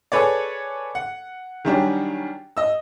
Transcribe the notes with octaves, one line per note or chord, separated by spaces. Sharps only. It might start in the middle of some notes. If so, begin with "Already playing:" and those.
G#4 A4 B4 C#5 D5
F#5
D#3 F#3 G3 C#4 D4
D#5 E6